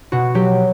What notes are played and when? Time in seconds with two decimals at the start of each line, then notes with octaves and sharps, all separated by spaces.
0.12 B2 F#4
0.35 F#3 G4